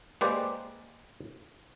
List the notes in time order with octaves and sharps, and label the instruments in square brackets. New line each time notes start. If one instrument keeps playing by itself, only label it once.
[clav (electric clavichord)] G#3 A#3 G4 B4 C5 D5